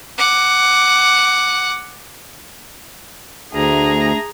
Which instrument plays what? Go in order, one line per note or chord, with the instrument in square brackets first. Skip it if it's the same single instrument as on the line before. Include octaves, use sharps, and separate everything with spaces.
[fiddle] F#5 D6
[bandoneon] D2 [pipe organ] A3 D4 [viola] G#4 A#5